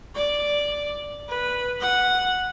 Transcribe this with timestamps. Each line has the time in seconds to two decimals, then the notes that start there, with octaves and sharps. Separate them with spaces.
0.16 D5
1.29 B4
1.81 F#5